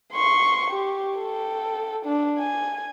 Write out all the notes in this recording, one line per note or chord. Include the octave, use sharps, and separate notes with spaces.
C6 C#6
G4
A4 G5
D4
G#5